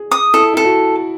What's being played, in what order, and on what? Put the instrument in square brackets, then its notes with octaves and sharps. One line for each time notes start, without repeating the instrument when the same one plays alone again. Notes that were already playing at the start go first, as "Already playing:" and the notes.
Already playing: [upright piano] G#4
[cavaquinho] D#6
[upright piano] E4 [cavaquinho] A4
[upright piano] E4 [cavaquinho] A4
[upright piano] F#4